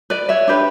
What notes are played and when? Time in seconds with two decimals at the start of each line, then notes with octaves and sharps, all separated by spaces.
0.10 B4 D5
0.29 C#5 E5
0.48 D4 G4 B4